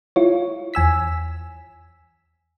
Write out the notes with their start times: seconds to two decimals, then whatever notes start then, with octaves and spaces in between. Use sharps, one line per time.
0.16 E4 F4 C#5
0.74 E2 G#5 E6 B6